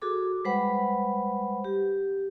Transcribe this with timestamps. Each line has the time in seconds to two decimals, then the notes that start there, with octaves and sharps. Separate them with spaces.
0.02 F#4 G#4 A4 D6
0.45 G3 G#3 B4 C5 F#5 B5
1.64 G4